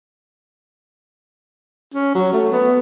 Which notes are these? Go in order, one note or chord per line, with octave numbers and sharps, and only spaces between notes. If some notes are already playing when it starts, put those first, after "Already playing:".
C#4
F#3
A3
B3